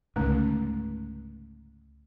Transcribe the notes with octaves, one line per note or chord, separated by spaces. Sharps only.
C#2 G#2 D3 A3 C#4